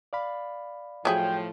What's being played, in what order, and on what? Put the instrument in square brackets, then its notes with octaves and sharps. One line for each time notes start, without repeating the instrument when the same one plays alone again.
[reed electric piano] D5 F5 B5
[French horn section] A2 F3 [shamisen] F#3 E4 G#4 [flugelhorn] G5